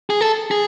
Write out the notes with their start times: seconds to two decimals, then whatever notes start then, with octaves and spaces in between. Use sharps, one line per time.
0.10 G#4
0.21 A4
0.51 G#4